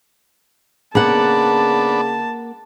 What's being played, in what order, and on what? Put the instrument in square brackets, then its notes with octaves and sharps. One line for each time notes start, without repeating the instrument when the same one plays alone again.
[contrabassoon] C#3 [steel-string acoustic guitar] A#3 F#5 [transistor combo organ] B3 D4 [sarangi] A5